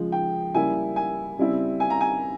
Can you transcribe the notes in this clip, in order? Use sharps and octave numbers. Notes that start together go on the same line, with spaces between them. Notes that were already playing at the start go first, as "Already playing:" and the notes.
Already playing: C#3 F3 G#3
G5
C#3 G3 A#3 E4 G#5
G#5
C#3 G3 C4 E4
G#5
A#5
G#5